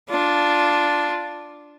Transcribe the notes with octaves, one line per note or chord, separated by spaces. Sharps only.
D4 F4